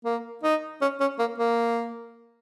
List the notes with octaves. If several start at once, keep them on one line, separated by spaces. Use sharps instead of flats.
A#3
D#4
C#4
C#4
A#3
A#3